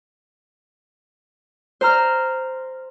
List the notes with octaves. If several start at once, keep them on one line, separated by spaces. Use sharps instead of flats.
C5 A#5 F6